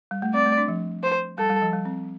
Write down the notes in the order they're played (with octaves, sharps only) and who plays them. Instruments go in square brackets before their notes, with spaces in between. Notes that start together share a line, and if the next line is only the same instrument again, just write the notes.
[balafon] G3
A3
[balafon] C4 [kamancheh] D5
[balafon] A3
D4
F3
[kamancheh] C5
[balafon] G3 [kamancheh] A4
[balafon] G3
F3
G3
C4